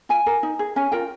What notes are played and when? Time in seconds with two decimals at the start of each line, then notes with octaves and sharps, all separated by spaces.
0.09 F4 G#5
0.26 A#4
0.43 D#4
0.59 G#4
0.76 C#4 G#5
0.92 F4 A#4 G5